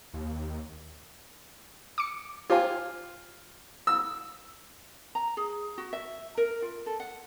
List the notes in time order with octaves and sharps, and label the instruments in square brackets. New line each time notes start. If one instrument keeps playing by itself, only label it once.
[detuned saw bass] D#2
[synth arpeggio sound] D6 C#7
[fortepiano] F4 [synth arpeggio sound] G4 C5 G#5
[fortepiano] E6
[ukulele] A#5
G#4
F#4
E5
A#4
F4
A4
F#5